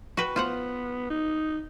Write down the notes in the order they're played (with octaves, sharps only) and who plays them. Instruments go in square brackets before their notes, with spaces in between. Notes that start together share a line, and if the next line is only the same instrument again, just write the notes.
[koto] F#4 B4 G5
[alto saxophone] B3 [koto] F4 C5 F#5
[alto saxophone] D#4